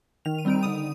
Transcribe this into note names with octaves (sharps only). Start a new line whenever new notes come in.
D#3 F7
D#7
G3 C4 D#4 D7
D3 D#6 D#7